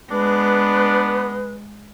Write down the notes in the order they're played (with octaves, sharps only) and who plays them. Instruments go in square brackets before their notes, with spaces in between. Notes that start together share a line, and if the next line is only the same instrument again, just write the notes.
[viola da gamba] G#3 [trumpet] B3 [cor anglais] D4 [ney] B4